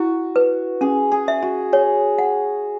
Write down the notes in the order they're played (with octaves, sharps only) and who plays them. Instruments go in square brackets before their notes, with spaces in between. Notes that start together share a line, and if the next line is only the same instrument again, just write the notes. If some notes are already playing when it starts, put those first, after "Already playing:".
Already playing: [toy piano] E4 [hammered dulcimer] F#4
[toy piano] B4
[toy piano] C#4 [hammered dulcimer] G#4
[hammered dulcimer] G#4
[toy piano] E5
[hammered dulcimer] F#4
[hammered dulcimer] G#4 [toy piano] C#5
[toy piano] F#5